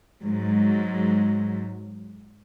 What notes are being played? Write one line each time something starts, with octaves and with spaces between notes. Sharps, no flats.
G#2 F#3